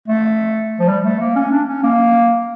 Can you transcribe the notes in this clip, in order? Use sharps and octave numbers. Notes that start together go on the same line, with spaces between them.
A3
F3
G3
A3
A#3
C#4
D4
C#4
A#3